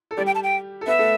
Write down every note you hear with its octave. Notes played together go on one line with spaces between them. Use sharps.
A4
G3 G4 D5
G5
A5
G5
A4
B3 B4 E5
A3 A4